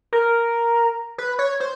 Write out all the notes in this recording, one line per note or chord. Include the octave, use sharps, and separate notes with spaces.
A#4
B4
C#5
C5